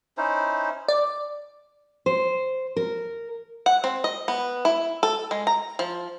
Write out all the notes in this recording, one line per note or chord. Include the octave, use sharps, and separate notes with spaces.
C#4 D#4 E4 C5
D5
C5
A#4
F#5
C4
D#5
B3
E4
A4
G#3
A#5
F3